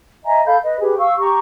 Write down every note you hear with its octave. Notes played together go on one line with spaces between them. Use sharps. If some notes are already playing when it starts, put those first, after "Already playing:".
D#5 E5 G#5 A#5
A4 F5 B5 G6
B4 D#5
G4 G#4 B4
F5 C#6 E6
G4 A#5 C#6